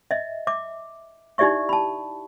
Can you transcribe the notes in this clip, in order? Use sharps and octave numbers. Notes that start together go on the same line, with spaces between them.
D#5 E5
E5 D6
D#4 E4 G4 D5 E5 C#6
A5 B5